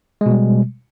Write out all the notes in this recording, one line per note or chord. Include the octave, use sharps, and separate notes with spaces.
B2 G3 G#3